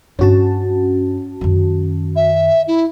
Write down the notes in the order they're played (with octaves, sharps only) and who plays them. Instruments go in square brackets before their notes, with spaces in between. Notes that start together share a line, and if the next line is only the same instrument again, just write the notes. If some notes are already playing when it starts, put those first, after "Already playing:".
[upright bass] G2 D4 [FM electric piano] C#4 F#4 A5
[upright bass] F#2 D#3
[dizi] E5
E4